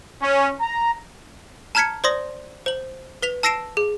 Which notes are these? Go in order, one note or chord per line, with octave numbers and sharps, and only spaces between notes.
C#4
A#5
A5 A#5 F6 G#6 B6 C#7
C5 D5 C6 D#6 A#6
C5 F#7
B4 B6 F7
A5 E6 A#6 C7 D7 E7
G#4